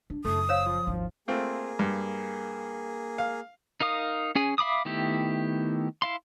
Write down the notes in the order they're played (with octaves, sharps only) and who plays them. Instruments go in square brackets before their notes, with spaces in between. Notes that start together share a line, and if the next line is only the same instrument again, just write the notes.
[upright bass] D4
[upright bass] F#1 [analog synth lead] A3 [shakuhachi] D#6
[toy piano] C5 C#5 F5 [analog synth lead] E6
[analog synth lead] F3
[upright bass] G#1 D#2
[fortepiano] A3 C4 F4 [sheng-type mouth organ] A#3 G#4
[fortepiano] G2
F5
[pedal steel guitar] D#4 A#4 F5 D#6
C#4 G#4 G#5
E5 F5 B5 D6 D#6
D#3 A3 B3 E4 G4
E4 F5 C6